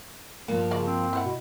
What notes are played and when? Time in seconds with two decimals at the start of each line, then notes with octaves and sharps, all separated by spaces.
0.48 G2 F3 A#3
0.71 C#3 F#3 G#3 D5
0.87 C4
1.13 E4 C5 F#5
1.25 B2